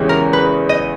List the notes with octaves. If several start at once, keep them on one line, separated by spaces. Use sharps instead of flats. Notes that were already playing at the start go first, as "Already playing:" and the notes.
Already playing: E2 C#3 E3 G#3 C#4 G4
A#4
B4
D#5